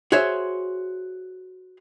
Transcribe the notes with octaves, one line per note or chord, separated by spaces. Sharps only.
F#4 G#4 C5 C#5 E5